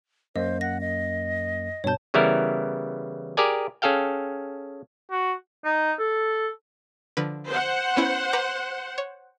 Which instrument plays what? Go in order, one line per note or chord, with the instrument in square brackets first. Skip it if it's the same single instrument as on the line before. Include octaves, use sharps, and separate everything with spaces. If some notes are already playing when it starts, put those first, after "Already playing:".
[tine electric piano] F#2 A#3 [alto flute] C5 [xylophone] D#5
[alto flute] F#5 [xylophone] A#6
[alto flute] D#5
[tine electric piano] G2 B2 G6 [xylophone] C#5 A5
[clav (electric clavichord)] C#3 E3 G3 B3 E4 A#4
G4 G#4 A#4 D5 G#5
C#4 G#4 A4 F5 G5
[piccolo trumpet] F#4
[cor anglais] D#4
A4
[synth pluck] D3 F3 B4
[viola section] C5 F#5
[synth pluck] B3 C#4 E4
B4 A#5 D6
C#5